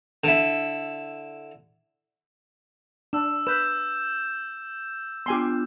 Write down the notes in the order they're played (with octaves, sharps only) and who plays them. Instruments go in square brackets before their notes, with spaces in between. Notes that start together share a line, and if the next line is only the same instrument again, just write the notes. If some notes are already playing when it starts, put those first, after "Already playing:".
[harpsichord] D3 E4
[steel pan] D4 [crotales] E6 E7
[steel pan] B4 [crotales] E6 G6 E7
[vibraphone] B3 D4 F4 [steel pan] G4 G#5 C6